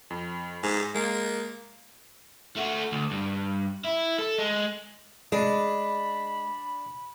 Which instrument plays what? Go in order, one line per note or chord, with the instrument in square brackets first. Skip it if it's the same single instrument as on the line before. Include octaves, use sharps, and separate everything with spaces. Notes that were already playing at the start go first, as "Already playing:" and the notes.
[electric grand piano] F2
[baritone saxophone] G#2 [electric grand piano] G#5 D#6
[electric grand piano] G#3 [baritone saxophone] A#3
[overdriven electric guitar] A3 F#4
D2
G2
E4
A4
G#3
[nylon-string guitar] G#3 [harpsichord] D4 [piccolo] B5